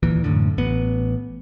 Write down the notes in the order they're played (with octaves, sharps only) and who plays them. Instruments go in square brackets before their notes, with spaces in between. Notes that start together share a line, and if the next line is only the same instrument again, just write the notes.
[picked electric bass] D#2 A#2 E3
F#2 A2 D3
A1 B3